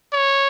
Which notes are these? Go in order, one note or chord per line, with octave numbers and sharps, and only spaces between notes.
C#5